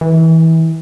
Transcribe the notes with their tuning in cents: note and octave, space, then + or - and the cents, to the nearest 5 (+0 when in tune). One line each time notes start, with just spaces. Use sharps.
E3 -25